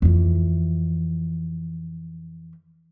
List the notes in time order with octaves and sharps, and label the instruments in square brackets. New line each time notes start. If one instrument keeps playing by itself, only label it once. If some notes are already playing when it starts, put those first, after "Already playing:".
[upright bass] F2 E3